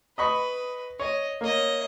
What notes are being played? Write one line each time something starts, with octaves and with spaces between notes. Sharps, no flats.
B4 D#5 B5 C#6
C#5 D#5
A#3 C#5 D#5